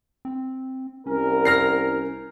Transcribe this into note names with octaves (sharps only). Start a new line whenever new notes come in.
C4
C2 C#4 A#4
F6 A#6 C7